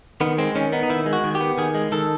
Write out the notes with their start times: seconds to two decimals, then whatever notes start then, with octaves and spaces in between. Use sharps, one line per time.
0.21 D#3 B3
0.38 G#3 C4
0.55 D#3 C#4
0.73 B3 D#4
0.83 D#4
0.90 D#3 E4
1.06 G#3
1.13 F#4
1.24 D#3
1.35 G4
1.41 B3
1.58 D#3 G#4
1.75 G#3
1.92 D#3 A4